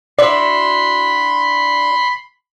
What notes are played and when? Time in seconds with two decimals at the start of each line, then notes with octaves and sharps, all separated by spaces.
0.19 D4 E4 F#4 D5 B5 C6